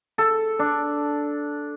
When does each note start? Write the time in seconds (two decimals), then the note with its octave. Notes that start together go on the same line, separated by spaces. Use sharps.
0.18 A4
0.59 D4